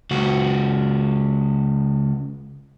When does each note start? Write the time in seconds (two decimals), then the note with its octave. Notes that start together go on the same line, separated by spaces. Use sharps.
0.11 C#2 F#4